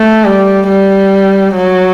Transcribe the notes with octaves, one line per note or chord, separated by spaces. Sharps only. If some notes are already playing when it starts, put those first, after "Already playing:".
Already playing: A3
G3
G3
F#3